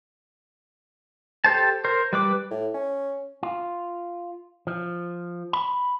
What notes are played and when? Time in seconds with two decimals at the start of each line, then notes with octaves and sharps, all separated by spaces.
1.44 G4 A4 C5 A5
1.85 A#4 C5
2.13 G3 B4 D6
2.51 A2
2.74 C#4
3.43 F4
4.67 F3
5.53 B5